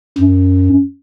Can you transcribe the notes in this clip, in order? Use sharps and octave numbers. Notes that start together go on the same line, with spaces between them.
F#2